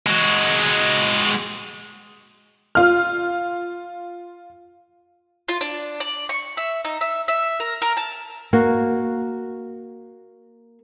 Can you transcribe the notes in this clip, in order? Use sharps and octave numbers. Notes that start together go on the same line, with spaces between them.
G#3 F#4
F4 F6
F4
D4
D5
C#6
E5
D#4
E5
E5
A#4
A#4
A5
A#3 F#4